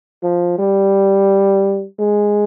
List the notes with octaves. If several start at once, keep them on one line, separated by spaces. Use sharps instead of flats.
F3
G3
G#3